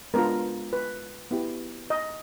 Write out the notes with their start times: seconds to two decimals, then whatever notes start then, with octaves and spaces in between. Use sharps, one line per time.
0.14 G#3 B3 D4 F4 A#4
0.73 B4
1.31 B3 E4 G4
1.90 D#5